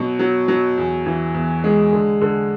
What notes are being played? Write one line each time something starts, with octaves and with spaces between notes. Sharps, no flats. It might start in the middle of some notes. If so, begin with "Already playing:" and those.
Already playing: B2 F#3
F#3
F#3
E2
E3
E2
G#3
D3
D3